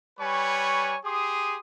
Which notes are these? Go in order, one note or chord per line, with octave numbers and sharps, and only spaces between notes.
G3 B4 C#5 G#5 C#6
G4 G#4 C6 D#6